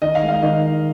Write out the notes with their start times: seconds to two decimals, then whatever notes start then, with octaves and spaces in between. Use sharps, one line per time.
0.02 D#3 D#5
0.15 F5
0.22 G#3
0.28 F5
0.42 D#3 D#5